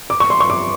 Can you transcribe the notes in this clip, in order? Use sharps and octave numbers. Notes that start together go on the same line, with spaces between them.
D6
C#6
C6
C#6
D6